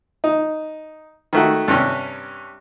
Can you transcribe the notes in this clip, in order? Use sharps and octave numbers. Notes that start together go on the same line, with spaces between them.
D#4
D#3 A3 F#4
G2 C3 C#4